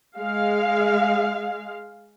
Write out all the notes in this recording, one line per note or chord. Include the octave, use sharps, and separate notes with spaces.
G#3 F5